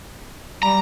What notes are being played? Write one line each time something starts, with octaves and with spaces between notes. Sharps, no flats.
G3 A#5